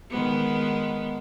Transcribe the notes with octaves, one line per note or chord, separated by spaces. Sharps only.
D#3 G#3 B3